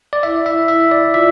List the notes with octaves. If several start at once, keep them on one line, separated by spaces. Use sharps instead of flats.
D5
E4 E5
E5
E5
D5
F4 E5